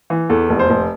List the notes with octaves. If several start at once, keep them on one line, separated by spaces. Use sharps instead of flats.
E3
E2 A4
F1
C5
F1